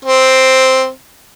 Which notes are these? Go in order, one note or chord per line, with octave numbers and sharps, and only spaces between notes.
C4